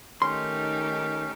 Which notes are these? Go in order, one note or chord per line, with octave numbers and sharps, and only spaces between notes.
D#3 A3 C#4 D#4 G4 C6